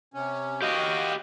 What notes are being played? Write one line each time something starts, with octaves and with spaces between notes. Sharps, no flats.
C3 C#4
F#4 G4 D#5 F5 G5